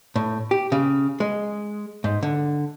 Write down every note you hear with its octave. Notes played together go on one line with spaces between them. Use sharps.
A2
G4
C#3
G#3
G#2
D3